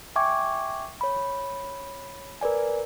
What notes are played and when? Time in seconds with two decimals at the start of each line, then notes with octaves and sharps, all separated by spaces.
0.16 E5 G5 G#5 C#6 D6 G#6
1.01 C#5 B5
2.41 A#4 B4 D5 G#5